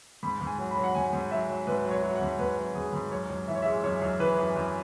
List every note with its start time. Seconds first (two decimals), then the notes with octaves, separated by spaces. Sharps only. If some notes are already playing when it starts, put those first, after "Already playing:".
0.23 G#2 B5
0.41 G#2
0.47 G#5
0.59 F#3
0.71 B5
0.77 F#3
0.84 F#5
0.95 G#2 G#5
1.13 G#2
1.31 F#3 E5
1.49 F#3
1.67 G#2 B4
1.85 F#3
1.91 C#5
2.03 F#3
2.15 F#5
2.22 G#2
2.39 G#2 B4
2.58 F#3
2.75 G#2 G#4
2.93 G#2
3.11 F#2 C#5
3.30 F#2
3.48 E3 E5
3.55 C#5
3.62 E5
3.66 G#3
3.84 F#2 C#5
4.02 F#2
4.19 E3 B4
4.38 F#2
4.56 F#2